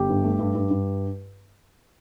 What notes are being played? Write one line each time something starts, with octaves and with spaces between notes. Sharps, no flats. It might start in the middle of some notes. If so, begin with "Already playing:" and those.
Already playing: G1 G4
G2
A3
G2
G2
G2